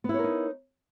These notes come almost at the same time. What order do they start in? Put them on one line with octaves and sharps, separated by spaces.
B3 E4 C#5 A#4 D#4